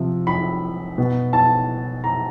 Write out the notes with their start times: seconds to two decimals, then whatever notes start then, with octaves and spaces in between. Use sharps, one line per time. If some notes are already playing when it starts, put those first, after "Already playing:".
Already playing: C3 F3
0.27 B5
0.98 B2
1.33 A5
2.04 A#5